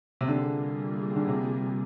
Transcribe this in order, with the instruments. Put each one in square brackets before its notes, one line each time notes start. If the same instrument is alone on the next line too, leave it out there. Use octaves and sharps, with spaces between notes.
[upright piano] C3
[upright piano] D3 [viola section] G3 A#3 F4 G#4
[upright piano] D3
C3